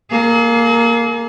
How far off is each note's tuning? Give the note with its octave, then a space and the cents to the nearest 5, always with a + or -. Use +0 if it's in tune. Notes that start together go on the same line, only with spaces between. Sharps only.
A#3 +0 G#4 +45